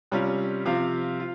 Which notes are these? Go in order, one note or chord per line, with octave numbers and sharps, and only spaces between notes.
C3 G3 C#4 F4
C3 F3 C4 F4 F5
F4